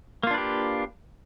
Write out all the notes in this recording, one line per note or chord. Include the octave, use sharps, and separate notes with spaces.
A#3 D4 F4 G4 B4